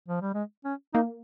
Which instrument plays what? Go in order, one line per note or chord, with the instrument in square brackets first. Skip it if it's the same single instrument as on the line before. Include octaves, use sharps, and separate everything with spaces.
[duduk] F3
G3
G#3
C#4
[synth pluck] A#3 [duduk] D#4